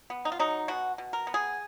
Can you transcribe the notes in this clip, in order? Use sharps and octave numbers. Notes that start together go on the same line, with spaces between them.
B3
D#4
F4
F#3 D#4
B2 F#4
B2
A#4
B3
G#4